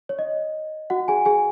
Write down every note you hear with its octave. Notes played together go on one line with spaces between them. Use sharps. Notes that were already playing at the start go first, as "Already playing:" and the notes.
C#5
D#5
F#4 F#5
G#4 G#5
G#4 G#5